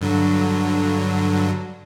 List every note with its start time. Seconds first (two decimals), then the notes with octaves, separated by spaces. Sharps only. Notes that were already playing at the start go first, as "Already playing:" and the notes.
0.01 G2 D3 F#3